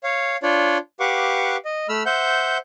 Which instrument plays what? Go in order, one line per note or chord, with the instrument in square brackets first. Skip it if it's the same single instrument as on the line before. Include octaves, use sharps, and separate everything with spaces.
[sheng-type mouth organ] C#5 F5
D4 F4 C#5 D5
G4 B4 F5 F#5 C#6 D6
D#5
A3 B5 E6 F6
C5 E5 F#5 G6